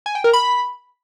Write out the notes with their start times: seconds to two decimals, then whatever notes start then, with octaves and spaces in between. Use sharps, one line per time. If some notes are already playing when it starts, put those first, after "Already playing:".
0.06 G#5
0.15 G5
0.24 A#4
0.33 B5